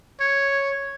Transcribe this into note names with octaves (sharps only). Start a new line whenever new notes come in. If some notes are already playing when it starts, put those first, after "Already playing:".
C#5